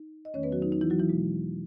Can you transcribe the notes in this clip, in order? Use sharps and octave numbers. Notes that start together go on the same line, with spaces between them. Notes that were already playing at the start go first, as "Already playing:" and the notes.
Already playing: D#4
D#5
E2 D#3 A3 C#4 C#5
B3 B4
F#3 F#4
D#4
D#4
E3 E4
F#3 F#4
E3 E4
B2 G#3 B3